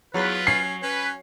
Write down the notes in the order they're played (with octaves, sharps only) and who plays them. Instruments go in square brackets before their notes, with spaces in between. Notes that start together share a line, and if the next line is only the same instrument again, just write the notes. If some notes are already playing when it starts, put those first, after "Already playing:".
[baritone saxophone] E2 [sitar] F#3 [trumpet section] F4 B4
[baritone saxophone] C#4 [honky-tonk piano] C7
[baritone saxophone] C#4 [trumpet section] B4